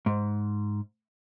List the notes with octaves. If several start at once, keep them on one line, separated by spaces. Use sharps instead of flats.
G#2